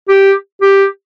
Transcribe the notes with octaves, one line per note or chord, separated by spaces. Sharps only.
G4
G4